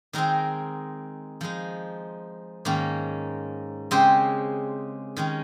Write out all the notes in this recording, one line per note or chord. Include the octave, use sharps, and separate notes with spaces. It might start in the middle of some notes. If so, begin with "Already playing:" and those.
D#3 G#3 C4 D#4 A#4
F3 G#3 D#4
G#2 D#3 A#3 C#4
C#3 G#3 C4 G4 C5
D#3 G#3 C#4